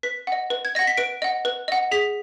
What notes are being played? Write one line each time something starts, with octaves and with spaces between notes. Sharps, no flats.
B4 B6
D#5 F#5
B4
G#6
D#5 F#5 A#6
B6
B4 D7
D#5 F#5
B4
D#5 F#5
G#4 B6